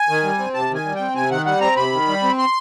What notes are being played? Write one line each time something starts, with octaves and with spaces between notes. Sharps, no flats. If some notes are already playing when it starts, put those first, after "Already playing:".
Already playing: G#5
D#3
G3
C4
C3 A5
D#3
G#5
G3
C4 G5
C3 G#5
D#3 F#5
G3 F#5
C4 A#5
C3 B5
D#3
G3
C4
C6